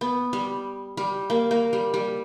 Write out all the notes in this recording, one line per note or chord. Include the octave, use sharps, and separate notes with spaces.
B3
G3
G3
A#3
A#3
G3
G3